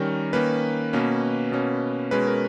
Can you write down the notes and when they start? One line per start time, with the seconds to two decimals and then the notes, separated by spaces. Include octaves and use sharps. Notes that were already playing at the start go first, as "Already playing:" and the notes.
Already playing: D#3 G3 C#4 A#4
0.33 D#3 A#3 C#4 B4
0.93 B2 A#3 C#4
1.52 B2 A#3 C#4
2.11 B2 G#3 C#4 B4
2.27 A#4